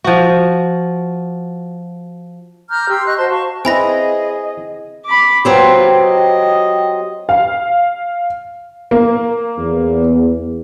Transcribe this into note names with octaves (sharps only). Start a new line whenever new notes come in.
F3 F#4
A#5 D6 F6 G6
G4 C6 E6
D#5 C#6 F#6
F#4 C5 A5 C6
F5 A5 C#6
C4 E4 G#4 B4 D#5 G#5 B5 A#6
B5 D6
F#3 C4 F4 G4 B4
D#5
F5
A#3
E2